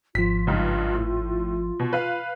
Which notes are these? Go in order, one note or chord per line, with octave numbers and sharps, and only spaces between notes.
G#1 F3 F4 B6
C#2 G2 D#4
A2
B2
B4 F5